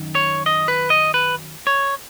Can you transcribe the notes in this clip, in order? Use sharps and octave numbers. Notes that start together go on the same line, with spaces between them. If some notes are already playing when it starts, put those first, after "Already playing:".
Already playing: F#2 D#3
C#5
D#5
B4
D#5
B4
C#5